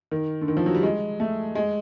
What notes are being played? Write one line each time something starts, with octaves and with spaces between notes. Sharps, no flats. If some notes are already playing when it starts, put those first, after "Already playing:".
D#3
D3
D#3
F3
F#3
G3
G#3
A3
G#3